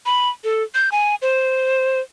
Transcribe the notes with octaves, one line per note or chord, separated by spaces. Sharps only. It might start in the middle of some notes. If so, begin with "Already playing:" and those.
B5
A4
G6
G#5
C5